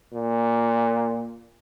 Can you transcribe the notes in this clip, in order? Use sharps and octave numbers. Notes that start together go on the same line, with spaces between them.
A#2